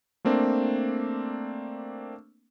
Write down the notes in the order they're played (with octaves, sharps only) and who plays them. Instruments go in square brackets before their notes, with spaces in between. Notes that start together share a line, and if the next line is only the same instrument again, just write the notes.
[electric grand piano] A3 A#3 C4 D4